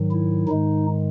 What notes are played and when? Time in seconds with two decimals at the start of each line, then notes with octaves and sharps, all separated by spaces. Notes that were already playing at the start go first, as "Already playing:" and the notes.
Already playing: G#2 D#3 F#3
0.11 E4
0.48 G#2 D#3 G#3 D#4